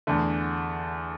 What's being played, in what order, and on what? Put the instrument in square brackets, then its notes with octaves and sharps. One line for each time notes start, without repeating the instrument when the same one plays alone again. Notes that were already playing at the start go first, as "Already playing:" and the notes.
[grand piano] E2 D3 A3